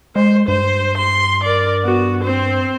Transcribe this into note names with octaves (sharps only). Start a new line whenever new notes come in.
G#3 C5
G2 C5
C6
A#4 D5
B3 F#4
C4 C5